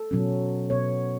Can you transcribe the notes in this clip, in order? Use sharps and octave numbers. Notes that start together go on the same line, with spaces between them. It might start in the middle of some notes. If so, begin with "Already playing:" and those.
Already playing: A4
B2 F#3 C#4
B2 B3 C#5